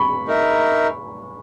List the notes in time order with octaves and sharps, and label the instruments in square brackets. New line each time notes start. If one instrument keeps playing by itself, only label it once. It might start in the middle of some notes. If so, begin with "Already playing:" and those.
Already playing: [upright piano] B5 C#6
[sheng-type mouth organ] D#4 A#4 E5